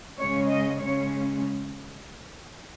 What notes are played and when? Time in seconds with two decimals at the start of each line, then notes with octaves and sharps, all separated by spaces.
0.19 C#3 G#3 C#4 C#5
0.50 D#5
0.81 C#3 G#3 C#4 C#5